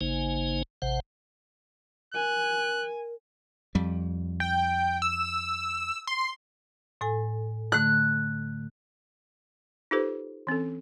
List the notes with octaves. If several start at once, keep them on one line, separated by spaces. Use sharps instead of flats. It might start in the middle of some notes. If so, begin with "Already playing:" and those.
G#1 C#3 A#3 D#4 C5 G#5
A1 C3 C5 F#5
A#4 G#5 F#6
F2 G3
G5
E6
C6
A2 A4 G#5
D3 A3 F#6
D#4 F4 G4 A4 B4 C5
E3 C4 C#4 A4